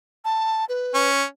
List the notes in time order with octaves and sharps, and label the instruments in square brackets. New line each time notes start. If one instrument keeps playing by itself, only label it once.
[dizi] A5
B4
[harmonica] C#4